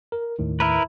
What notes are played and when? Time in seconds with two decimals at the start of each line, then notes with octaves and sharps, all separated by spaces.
0.12 A#4
0.39 D#2 A2 D#3
0.60 E4 A#4 B4